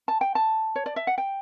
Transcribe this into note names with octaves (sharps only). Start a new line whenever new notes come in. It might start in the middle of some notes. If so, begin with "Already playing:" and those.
A5
G5
A5
C#5
D5
E5
F#5
G5